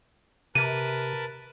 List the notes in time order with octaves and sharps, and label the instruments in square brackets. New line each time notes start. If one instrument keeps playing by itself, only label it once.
[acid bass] C3 [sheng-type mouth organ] A#4 B4 A5 [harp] D#7